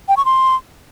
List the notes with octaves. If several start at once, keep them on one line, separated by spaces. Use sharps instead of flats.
G5
C#6
C6